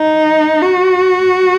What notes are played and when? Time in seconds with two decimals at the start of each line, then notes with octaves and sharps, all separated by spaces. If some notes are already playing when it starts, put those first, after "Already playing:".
Already playing: D#4
0.62 F#4